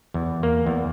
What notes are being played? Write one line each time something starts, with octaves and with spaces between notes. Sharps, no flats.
E2
A#3
E2